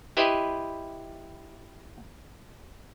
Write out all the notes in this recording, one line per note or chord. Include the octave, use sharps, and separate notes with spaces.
E4 G4 B4 C5 D#5